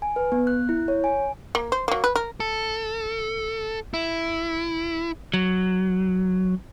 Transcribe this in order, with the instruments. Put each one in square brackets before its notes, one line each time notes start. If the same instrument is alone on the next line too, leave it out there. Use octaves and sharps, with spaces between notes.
[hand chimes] G#5
B4
B3
F#6
E4
C#5
G#5
[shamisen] A#3
C5
F#3 A#3
B4
A#4
[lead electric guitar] A4
E4
F#3